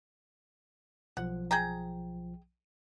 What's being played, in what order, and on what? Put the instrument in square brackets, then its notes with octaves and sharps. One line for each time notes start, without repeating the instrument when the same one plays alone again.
[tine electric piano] B1 F3 [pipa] F#5
[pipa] G#4 G5 A#5